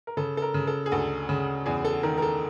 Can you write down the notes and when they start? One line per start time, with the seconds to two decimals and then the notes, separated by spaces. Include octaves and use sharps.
0.07 A#4
0.17 C#3 A4
0.37 A4
0.42 A#4
0.54 C#3
0.67 A4
0.86 G#4
0.92 D2 A4
1.29 C#3
1.66 E2 G#4
1.85 A4
2.03 D#3 A#4
2.18 A#4
2.22 A4